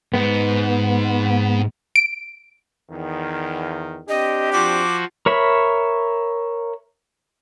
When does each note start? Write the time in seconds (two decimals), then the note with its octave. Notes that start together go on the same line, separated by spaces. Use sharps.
0.14 G#2 B3
1.96 D7
2.91 E2 D#3
4.09 C4 D4 G4 D#5
4.52 F3 F#4 D6
5.26 A#4 C#5 E5 B5